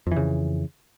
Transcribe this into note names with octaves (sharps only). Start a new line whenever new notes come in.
F2 C#3 E3